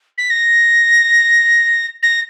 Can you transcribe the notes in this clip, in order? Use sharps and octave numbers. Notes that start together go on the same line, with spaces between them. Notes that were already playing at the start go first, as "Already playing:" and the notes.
B6
A#6
A#6